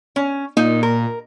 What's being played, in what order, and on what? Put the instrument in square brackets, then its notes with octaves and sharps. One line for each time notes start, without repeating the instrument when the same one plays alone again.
[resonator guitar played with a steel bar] C#4
[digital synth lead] A#2 [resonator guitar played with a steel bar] D#4
[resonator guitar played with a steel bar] A#4